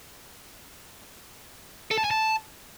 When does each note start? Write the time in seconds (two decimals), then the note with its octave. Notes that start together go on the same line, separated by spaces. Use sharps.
1.91 A4
1.98 A5
2.04 G#5
2.11 A5